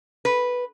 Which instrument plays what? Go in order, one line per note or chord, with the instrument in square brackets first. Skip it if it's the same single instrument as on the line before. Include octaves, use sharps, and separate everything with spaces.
[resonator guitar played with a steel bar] B4